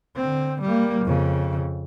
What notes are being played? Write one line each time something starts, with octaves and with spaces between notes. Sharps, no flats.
D3 C4
G3 A#3
F2 C#3